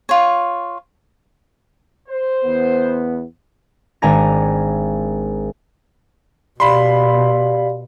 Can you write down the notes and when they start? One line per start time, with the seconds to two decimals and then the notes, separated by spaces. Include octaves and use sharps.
0.09 F4 C#5
2.08 C5
2.45 E2 B3
4.02 G#1 D4 G#5 A#5 A#6
6.60 B2 G4 D5 F5 B5 C6